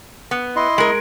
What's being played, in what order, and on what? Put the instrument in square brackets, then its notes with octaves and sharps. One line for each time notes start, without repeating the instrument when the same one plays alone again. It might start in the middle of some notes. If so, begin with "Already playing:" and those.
[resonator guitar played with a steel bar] B3
[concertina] E4 D#5 C6
[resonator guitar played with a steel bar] G#3 A#4